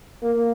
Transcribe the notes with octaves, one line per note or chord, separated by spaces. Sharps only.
A#3